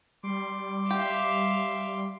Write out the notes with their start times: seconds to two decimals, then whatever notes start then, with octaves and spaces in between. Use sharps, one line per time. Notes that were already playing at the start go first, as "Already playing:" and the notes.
0.23 G3 C6 D6
0.91 G4 E5 F5